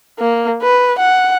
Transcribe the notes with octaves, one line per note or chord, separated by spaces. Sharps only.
A#3
B4
F#5